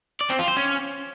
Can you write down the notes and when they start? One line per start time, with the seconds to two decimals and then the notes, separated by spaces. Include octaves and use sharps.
0.21 D5
0.30 C4
0.39 F4
0.48 C5
0.57 C#4